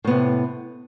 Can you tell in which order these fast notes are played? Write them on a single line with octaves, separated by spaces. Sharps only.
A2 B3 C3